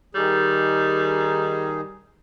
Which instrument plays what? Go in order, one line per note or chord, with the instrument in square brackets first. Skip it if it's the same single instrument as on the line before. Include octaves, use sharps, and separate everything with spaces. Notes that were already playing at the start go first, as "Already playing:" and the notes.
[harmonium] D#3 D#4 G#4 [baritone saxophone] G3